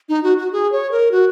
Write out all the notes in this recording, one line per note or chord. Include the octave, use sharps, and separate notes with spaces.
D#4
F#4
F#4
G#4
C#5
A#4
F#4